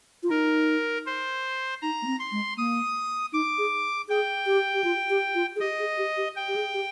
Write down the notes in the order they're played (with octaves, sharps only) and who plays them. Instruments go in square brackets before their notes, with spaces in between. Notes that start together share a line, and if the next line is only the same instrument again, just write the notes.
[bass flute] F4
[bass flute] D#4 [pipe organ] A#4
[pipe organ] C5
[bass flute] D#4 [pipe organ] A#5
[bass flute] A#3
C4
[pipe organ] C6
[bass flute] G#3
[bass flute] A#3 [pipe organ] D#6
[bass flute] D#4 [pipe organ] D6
[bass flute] G#4
[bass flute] G#4 [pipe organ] G5
[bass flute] G4
G4
F4
G4
F4
G#4
[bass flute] G4 [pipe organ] D#5
[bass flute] G#4
G4
G4
[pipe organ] G5
[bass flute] G4
G#4
G4